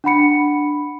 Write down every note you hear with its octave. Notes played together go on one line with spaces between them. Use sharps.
D4 F#5 B5 C#7